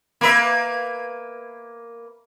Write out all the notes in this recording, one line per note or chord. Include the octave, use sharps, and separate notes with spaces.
A#3 B4 E5